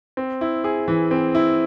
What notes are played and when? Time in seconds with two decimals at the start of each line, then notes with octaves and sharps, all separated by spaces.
0.17 C4
0.41 E4
0.64 G#4
0.88 E3
1.11 C4
1.35 E4